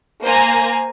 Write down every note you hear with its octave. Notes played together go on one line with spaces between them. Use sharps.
A#3 C5 G#5 A#5